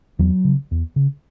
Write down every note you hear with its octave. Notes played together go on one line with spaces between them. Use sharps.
E2 F#3
C#3
E2
C#3